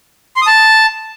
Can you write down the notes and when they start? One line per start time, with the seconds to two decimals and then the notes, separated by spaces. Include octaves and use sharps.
0.36 C6
0.42 D#6
0.47 A5